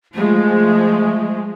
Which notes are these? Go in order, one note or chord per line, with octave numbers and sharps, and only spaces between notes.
F3 G#3 A3